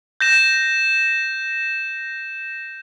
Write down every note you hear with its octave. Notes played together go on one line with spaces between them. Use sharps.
G6 A#6 E7